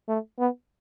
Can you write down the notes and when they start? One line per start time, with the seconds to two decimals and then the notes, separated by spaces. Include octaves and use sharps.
0.09 A3
0.39 B3